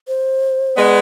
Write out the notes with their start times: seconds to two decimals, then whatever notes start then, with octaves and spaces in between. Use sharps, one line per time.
0.08 C5
0.77 G#3 B3 D5